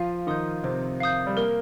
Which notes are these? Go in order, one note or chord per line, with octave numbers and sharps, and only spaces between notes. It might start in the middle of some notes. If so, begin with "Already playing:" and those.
Already playing: F3 F4 F5
D#3 D#4 C6 D#6 G6
C3 C4 C5
F5 D#6 G6
G3
A#3 A#4